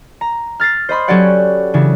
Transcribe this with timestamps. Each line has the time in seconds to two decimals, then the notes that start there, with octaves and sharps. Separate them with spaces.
0.21 A#5
0.60 F6 A6 A#6 C7
0.89 C5 D#5 B5 C6
1.08 F#3 C#4 G4 A4 D5 F#5
1.74 C#3 E3 D4 F#4